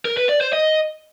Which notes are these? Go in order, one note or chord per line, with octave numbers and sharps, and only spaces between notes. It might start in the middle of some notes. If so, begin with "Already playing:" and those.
A#4
B4
D5
C5
D#5